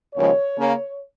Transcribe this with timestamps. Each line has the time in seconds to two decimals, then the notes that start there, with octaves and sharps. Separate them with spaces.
0.15 D#2 C#3 F3 G#3 C#5
0.57 C#3 A#3 C#4